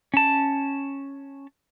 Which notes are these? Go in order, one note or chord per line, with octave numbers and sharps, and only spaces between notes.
C#4 A5